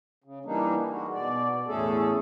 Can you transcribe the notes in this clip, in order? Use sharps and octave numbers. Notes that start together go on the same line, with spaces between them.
C#3
E3 G3 A#3 D4 D#4
G#3 F#4
B2 D5
E2 A2 A3 C#4 G#4 A4